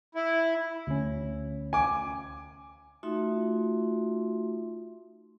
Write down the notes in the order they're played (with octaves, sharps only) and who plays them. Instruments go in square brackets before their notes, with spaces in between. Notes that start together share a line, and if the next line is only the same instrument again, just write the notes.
[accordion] E4
[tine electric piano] D2 C#4
[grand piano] G#5 D6
[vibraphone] A3 D#4 F4 F#4 E5 C6